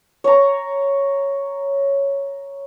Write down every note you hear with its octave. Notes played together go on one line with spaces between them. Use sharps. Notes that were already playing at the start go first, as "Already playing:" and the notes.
C#5 A#5